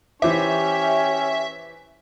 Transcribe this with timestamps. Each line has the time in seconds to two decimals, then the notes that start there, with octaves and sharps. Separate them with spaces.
0.22 E3 C#4 G4 C5 C#5 E5 D6